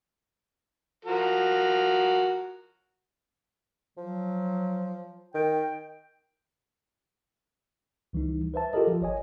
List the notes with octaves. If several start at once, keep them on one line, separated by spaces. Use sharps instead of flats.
F3 F#4 A#4
F3 F#3
D#3 G5
C#2 E3 G3 D#4
B4 C5 E5 A5
F4 G4 A4 A#4 D#5
F3
G#1 C#5 D#5 G#5